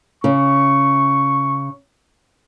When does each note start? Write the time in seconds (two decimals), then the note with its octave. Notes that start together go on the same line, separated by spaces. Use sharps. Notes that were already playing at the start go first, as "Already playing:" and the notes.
0.24 C#3 C#6